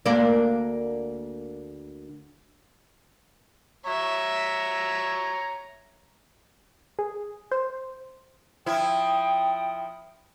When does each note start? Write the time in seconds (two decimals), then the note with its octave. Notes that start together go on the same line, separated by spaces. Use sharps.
0.06 D2 A#3 D4
3.86 C#5 E5 A#5
6.99 G#4
7.52 C5
8.66 F3 E4 G5 D#6